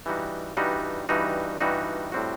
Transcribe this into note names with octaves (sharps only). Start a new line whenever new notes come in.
G2 E3 G3 D#4 F#4
G2 E3 G3 D#4 F#4
G2 E3 G3 D#4 F#4
G2 E3 G3 D#4 F#4
A2 G3 C4 F#4